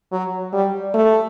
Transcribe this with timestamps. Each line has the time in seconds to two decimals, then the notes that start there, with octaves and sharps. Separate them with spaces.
0.12 F#3
0.53 G3
0.94 A3